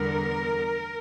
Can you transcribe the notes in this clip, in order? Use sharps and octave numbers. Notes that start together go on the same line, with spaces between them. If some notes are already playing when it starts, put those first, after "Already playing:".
Already playing: E2 D3 G3 B3 A#4